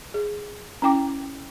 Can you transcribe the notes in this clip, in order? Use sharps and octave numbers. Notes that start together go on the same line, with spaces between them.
G#4
C#4 E4 G5 D6